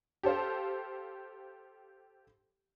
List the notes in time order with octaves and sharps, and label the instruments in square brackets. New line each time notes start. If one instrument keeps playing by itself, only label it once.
[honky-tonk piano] G4 A4 C5 F5